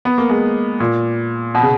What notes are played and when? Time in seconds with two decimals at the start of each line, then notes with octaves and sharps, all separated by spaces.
0.05 B3
0.18 A#3
0.30 G#3
0.80 A#2
1.55 B2
1.62 C#3